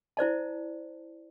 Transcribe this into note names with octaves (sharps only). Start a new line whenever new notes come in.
E4 C5 D5 A5